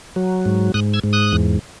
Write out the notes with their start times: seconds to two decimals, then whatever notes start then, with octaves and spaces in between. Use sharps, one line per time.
0.16 F#3
0.45 G#2
0.74 G#2 D#6 F#6
0.94 E6 G#6
1.04 G#2
1.13 D#6 F#6
1.32 E2